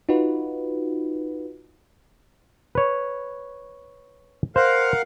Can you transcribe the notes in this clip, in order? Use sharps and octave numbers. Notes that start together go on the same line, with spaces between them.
D#4 F4 F#4 B4
B4 C#5
A#4 C5 F5 F#5